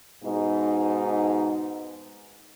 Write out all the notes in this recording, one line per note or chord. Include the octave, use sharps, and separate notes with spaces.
G#2 B2 D#4